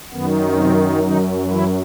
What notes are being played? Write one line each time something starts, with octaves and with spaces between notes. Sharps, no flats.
F#2 D#3 B3
C3 C4
D#3 D#4
E3 E4